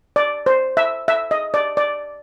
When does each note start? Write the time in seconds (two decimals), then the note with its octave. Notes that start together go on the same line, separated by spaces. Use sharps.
0.16 D5
0.46 C5
0.77 E5
1.08 E5
1.31 D#5
1.54 D5
1.77 D5